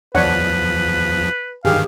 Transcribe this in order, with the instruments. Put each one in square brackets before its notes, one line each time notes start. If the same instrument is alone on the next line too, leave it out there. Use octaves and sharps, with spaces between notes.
[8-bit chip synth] E2 F3 [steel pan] D4 C#5 F#5 [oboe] B4
[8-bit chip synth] G2 D#3 [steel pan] G4 G#4 [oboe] F5